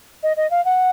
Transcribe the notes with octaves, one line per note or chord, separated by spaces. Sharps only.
D#5
D#5
F5
F#5